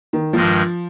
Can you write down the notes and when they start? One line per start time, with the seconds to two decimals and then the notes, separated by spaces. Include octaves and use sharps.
0.13 D#3
0.33 G2 D#3 F3 G#3